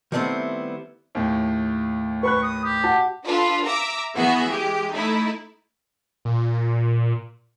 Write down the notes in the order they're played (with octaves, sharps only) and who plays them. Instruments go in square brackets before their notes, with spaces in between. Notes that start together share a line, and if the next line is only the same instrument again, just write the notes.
[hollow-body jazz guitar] D#3 G3 A3 B3 C4 E4
[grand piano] D#2 A2
[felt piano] B4 B5 F#6 [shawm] C#6
[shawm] D#6
G4
[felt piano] F#4 F#5 A5
[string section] D4 F4 A4 B4
E5 A#5 D6 E6
E3 B3 F#4 G#4 E5
G#3 G4
A3 D#4 E4
[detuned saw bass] A#2